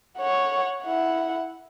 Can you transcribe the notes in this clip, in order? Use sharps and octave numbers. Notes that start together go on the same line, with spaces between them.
C#5 F#5
E4 F#5